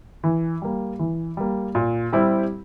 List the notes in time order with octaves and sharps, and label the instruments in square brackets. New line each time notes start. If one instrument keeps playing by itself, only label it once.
[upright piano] E3
G3 A#3
E3
G3 A#3
A#2
G3 C4 E4 G4